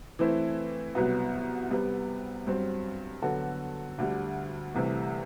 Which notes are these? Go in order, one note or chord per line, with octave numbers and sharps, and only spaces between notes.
E3 A3 C4 E4
C2 B2 F#3 B3 F#4
C3 G3 B3
G2 F#3 C4
D3 F#3 B3 F#4 A4
D2 D3 G3
C2 C3 E3 A3